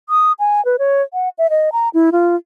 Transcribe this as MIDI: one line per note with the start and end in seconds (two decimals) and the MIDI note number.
0.09 0.32 87
0.39 0.64 80
0.65 0.76 71
0.79 1.02 73
1.13 1.29 78
1.38 1.47 76
1.50 1.70 75
1.72 1.89 82
1.94 2.10 64
2.12 2.36 65